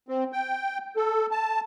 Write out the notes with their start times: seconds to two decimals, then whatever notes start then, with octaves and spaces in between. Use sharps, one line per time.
0.08 C4
0.33 G5
0.96 A4
1.31 A5